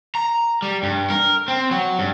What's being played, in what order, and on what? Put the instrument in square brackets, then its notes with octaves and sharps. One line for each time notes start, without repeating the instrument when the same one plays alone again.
[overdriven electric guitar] A#5
G3
G2
A#4
C4
F#3
G2